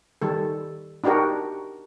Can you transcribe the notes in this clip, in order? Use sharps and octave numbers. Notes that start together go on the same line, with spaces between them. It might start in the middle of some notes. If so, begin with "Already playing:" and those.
D#3 G3 A4
D4 D#4 F#4 G4 A#4